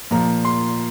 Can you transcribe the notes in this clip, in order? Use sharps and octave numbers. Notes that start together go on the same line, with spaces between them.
A#2 F3 A#5
C6